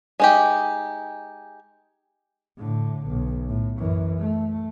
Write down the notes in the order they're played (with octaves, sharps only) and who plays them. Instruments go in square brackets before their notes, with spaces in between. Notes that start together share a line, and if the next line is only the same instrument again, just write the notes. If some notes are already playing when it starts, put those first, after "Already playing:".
[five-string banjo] G#3 D#4 G4
[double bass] A2 D3
B1
A2
F#2 E3
A3